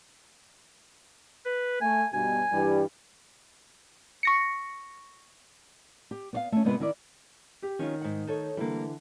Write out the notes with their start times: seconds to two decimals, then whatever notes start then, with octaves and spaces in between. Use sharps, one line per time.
1.46 B4
1.81 A3 G#5
2.13 G2 B2 G#5
2.52 G2 E3 G3
4.23 C#6 A#6 C#7
6.11 G4
6.33 B3 C#5 F5
6.52 A3 C#4
6.65 C3 G#3 B3 E4 G4 B4
6.80 D#3 E4 D5
7.62 G4
7.79 D#3 C#4 D#4 F4
8.01 G#2 F#5
8.27 D#4 A4 C#5
8.57 D3 E3 G3 A#3